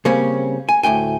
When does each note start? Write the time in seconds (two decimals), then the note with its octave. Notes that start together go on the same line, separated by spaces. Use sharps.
0.05 C#3 G3 A#3 C4 C#4
0.69 G#5
0.83 D2 A2 G5 G#5